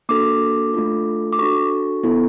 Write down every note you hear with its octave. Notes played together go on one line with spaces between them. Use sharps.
A#3 D4 F#4 A4 D6
A3 D4 F4 A4
D6
D4 F#4 A4 C#6
B3 E4 A4